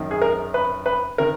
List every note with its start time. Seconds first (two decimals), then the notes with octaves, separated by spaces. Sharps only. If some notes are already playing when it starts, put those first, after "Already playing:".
Already playing: F#2 D#3
0.11 G#4
0.22 A#4
0.54 B4
0.86 B4
1.18 D#3 A#4